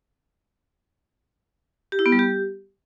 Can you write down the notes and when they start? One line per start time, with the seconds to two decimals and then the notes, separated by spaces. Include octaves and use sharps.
1.92 G4
1.99 E4
2.06 B3
2.12 G3
2.19 G4